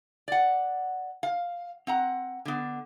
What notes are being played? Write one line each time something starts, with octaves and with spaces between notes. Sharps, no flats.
D5 F#5
F5
C4 F#5 A#5
D3 B3